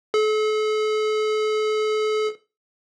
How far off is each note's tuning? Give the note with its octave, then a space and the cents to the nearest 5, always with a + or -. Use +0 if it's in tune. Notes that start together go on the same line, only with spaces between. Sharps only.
A4 -40